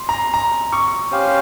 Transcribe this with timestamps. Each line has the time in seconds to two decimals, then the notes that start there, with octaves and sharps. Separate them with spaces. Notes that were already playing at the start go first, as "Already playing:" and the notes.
Already playing: C6
0.09 A#5
0.34 A#5
0.72 C#6
1.11 C#4 G4 C5 F5